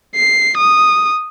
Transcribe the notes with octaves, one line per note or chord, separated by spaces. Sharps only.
C7
D#6